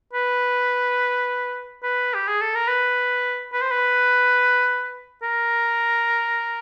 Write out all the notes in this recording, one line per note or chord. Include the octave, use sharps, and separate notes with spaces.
B4
B4
G4
G#4
A4
A#4
B4
B4
C5
B4
A#4